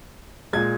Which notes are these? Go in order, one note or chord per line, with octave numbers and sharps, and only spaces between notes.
A#2 G#3 G#6